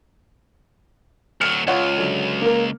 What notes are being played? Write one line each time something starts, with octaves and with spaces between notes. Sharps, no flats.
D2 F#3 F6 C#7 E7
C#2 F4 C#5 F#5
D3 F#3
A#3 A#4